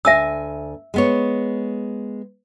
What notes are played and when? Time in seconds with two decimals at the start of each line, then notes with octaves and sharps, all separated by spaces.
0.05 D2 E5 G#5 E6
0.94 G#3 B3 C#5